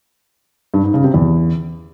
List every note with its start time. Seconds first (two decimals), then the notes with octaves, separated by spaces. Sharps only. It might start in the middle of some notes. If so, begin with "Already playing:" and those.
0.74 G2
0.84 G#2
0.94 C#3
1.04 C3
1.14 E2